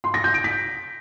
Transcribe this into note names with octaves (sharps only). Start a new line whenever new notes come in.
C6
A#6
G6
D7
B6